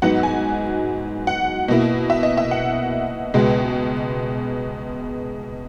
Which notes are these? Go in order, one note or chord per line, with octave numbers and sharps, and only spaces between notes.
G#2 F#3 B3 D#4 F#5
G#5
F#5
B2 A#3 E4
E5
D#5
E5
F#5
C#2 B2 G#3 B3